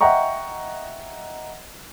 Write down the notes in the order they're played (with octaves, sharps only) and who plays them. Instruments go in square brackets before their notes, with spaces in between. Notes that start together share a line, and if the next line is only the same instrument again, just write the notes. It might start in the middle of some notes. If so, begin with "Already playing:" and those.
[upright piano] D#5 E5 F#5 G5 A#5 C#6